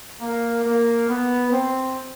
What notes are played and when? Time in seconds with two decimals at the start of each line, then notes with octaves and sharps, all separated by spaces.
0.21 A#3
0.64 A#3
1.08 B3
1.51 C4